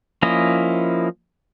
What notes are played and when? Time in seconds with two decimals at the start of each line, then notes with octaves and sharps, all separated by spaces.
0.22 F3 A#3 C#4 E4 D#5